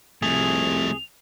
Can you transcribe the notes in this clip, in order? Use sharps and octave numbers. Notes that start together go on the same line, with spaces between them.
C2 F3 A3 G#4 F7